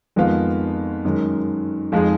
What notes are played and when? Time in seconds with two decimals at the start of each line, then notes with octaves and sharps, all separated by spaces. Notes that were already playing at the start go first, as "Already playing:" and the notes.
0.16 F2 D#3 G#3 B3 F4
1.05 F#2 D#3 G#3
1.92 F2 F3 G#3 D#4 G#4